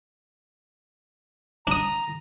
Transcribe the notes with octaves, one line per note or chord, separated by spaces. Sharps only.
D4 A#5 D#6